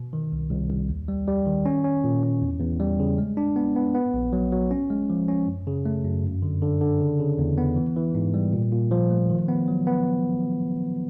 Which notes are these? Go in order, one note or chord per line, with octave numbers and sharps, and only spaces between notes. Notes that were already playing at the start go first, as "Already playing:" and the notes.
Already playing: B2
D#3
C2
C2
C2
D#2
G3
G3
D#3
C#4
C#4
A#2
C#4
E2
E2
G3
C#3
G#3
D4
B3
B3
B3
A#1
F#3
F#3
C#4
G#3
F3
C#4
F#2
C#3
A3
F#2
G2
D3
D3
D3
C#3
C#3
E2
B3
E3
E3
G#2
G3
A#2
A#2
F3
A3
D#3
B3
F#3
B3